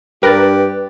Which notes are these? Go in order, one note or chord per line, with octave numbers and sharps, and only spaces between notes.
G2 G4 A#4 B4 F#6 A6